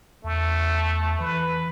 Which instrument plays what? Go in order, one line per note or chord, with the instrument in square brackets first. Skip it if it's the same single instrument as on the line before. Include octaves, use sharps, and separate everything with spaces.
[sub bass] E2 [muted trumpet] A3
[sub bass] E3 [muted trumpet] B4